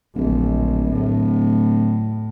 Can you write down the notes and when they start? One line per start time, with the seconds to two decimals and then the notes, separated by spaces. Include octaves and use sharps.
0.16 D1 A#1
0.92 A2